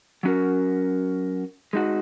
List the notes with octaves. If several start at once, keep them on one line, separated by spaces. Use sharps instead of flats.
F#3 C#4 F#4 A#4
G#3 D#4 F#4